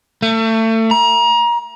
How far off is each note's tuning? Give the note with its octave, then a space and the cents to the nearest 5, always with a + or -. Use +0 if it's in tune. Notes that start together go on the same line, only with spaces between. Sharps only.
A3 +30
A#5 +30